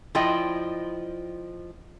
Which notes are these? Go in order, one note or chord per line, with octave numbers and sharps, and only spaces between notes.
F3 E4 D5 D#5 G5